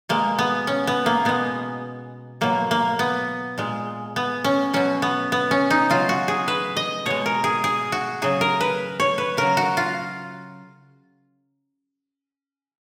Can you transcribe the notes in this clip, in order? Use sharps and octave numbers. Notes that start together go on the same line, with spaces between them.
B2 G#3 A#3
B3
C#4
B3
A#3
B2 G#3 B3
B2 F#3 A#3
A#3
B3
A#2 G#3
B3
C#4
B2 F#3 C#4
B3
B3
C#4
D#4
C#3 F#3 F4
F#4
G#4
B4
D#5
B2 G#3 C#5
A#4
G#4
G#4
F#4
C#3 F#3 G#4
A#4
B4
C#5
B4
C#3 F#3 A#4
F#4
F4